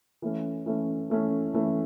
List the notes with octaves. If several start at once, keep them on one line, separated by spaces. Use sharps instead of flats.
E3 A3 C#4
E3 A3 C#4
E3 A3 C#4
E3 A3 C#4